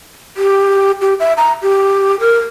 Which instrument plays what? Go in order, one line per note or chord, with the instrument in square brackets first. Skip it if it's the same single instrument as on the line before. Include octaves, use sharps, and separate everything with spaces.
[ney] G4
G4
E5
A#5
G4
A#4